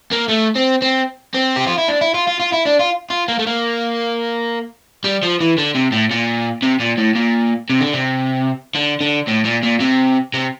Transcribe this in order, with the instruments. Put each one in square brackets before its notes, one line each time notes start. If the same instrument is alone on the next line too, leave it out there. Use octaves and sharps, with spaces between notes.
[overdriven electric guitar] A#3
A3
C4
C4
C4
G4
F4
E4
D4
E4
F4
F4
F4
E4
D4
F4
F4
A#3
A3
A#3
G3
F3
E3
D3
C3
A2
A#2
C3
A#2
A2
A#2
C3
D3
C3
D3
D3
A2
A#2
A#2
C3
C3